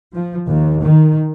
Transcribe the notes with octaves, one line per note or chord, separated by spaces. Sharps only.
F3
D#2
D#3